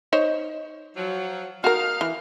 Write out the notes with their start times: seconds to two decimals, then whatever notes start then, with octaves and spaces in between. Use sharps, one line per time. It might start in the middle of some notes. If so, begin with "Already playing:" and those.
0.13 D#4 C5 C#5
0.96 F3 F#3
1.64 D#4 F#4 A#4 F5
2.01 E3